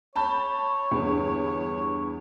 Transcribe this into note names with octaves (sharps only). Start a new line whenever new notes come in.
C#5 A5 B5 G6
E2 G2 D3